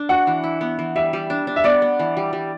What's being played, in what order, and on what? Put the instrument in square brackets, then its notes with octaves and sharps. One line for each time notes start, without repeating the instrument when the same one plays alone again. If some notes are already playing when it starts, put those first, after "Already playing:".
Already playing: [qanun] D4
[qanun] F#4 [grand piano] F#5
[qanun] E3
E4
B3
E3
[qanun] G3 [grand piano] E5
[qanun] G3
D4
D4
[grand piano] E5
[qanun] B3 [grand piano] D5
[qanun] B3
E3
G3
G3